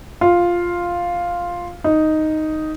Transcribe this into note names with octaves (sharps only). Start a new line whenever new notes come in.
F4
D#4